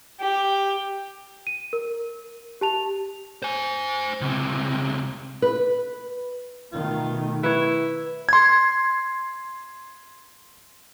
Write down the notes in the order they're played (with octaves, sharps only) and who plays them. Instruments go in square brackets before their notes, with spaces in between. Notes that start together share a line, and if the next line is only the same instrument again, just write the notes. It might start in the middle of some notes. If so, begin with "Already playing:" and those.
[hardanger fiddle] G4
[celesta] D#7
A#4
G4 A5 F7
[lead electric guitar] C5 G#5
C#2 C3
[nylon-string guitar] B4
[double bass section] B2 D#3 A3 [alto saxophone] F4
[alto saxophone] E4 [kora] B4 C#5
[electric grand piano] C6 G#6